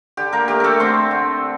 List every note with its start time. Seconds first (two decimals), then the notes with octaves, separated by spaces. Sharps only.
0.17 D3 G4
0.33 A#3 A#4
0.48 A3 G4
0.60 A3 A4 A#4
0.80 D3 C4 C5
1.11 D3